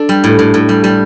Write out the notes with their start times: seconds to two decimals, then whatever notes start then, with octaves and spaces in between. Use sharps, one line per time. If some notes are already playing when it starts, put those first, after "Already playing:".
Already playing: D4 A4
0.09 G3
0.24 A2
0.39 A2
0.54 A2
0.69 G3
0.84 G3